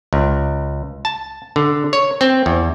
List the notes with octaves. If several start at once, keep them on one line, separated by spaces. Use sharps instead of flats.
C#2
A5
D3
C#5
C4
E2